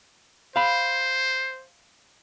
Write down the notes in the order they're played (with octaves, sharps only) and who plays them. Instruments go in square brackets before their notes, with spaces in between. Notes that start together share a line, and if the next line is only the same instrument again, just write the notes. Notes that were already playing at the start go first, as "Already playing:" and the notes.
[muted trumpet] C5 [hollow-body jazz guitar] F5 B5